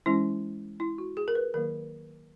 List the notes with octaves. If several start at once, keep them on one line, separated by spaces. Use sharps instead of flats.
E3 G#3 C#4 E4
E4
F#4
G#4
A#4
B4
D#3 F#3 A#3 A#4